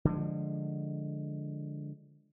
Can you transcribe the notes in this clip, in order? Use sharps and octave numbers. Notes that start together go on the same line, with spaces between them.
D3 F3 G#3